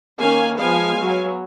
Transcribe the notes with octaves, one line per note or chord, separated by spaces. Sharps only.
D#3 A#3 C#4 F5 G#5
F3 G#3 B3 F5 G#5
F#3 B3